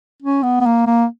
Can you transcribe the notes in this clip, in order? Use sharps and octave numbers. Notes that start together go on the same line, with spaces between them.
C#4
B3
B3
A#3
A#3